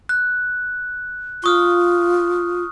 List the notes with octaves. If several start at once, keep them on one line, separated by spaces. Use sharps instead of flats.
F#6
F4 C#6 D#6 F6